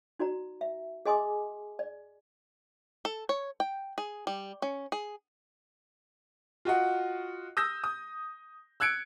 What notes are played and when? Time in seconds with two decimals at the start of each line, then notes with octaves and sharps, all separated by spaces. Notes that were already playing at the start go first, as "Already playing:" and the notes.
0.19 D#4 F#4 D5 A#5
0.61 E5
1.06 G#4 D#5 G#5 C6 D6 D#6
1.79 D5
3.05 A4
3.29 C#5
3.60 G5
3.98 G#4
4.27 G3
4.62 C#4
4.92 G#4
6.65 F4 F#4 D#5 F#5
7.57 D#6 E6 G6 A#6
7.84 D#6
8.80 E6 F#6 G#6 C#7 D7